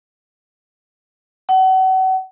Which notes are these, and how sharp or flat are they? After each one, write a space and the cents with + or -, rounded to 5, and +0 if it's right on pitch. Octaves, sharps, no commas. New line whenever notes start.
F#5 +35